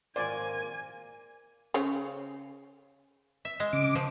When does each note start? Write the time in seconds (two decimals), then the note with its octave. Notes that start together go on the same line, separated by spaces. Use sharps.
0.16 G#1 A#2 A#3 C5 D5 G#5
1.74 C#3 C5 C#5
3.45 E5
3.60 G#3
3.73 C#3 D6
3.95 F3